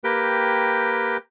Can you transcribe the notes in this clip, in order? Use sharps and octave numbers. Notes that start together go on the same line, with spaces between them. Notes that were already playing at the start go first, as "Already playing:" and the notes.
A#3 G4 A#4 B4 G5